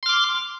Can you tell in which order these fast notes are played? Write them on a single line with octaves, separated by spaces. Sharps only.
C6 F6 D6